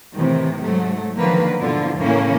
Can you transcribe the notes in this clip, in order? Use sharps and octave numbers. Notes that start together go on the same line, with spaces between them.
A2 C3 D#3 E3
G#2 F#3 A3
D3 D#3 F3 A#3 B4
G#2 B2 D3 E4 F4
A2 C#3 E3 A#3 C#4 E4